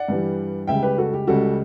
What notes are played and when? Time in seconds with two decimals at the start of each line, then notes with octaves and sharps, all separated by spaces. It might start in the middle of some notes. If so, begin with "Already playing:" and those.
Already playing: D5 F#5
0.08 G2 E3 G3
0.67 C#2 C#3 G3 E5 G5
0.83 G4 B4
0.98 F#4 A4
1.13 G4
1.27 C#2 C#3 G3 F#4 A4